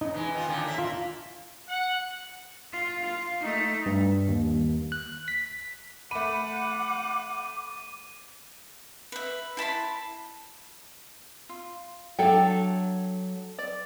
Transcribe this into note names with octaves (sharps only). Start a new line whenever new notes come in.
C#3 D#4
E3 G#3
D#3 F4
A2 D3 D#3
A#3 E5
F4
F#5
F4
F4
A3 D#4
G2
D#2
F#6
B6
A3 F#5 B5 D6 D#7
B4 E5
E4 A5 B5 C6
F4
F#3 D4 A4 E5 G5
D5